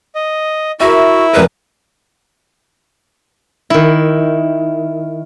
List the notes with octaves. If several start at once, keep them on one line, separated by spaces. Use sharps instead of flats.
D#5
E4 F#4 A#4 E5
F1 A#4 B4
D#3 E4